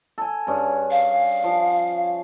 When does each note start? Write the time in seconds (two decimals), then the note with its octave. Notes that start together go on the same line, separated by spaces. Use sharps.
0.18 A4 G#5
0.47 G2 C#4 G#4
0.91 F5
1.44 F3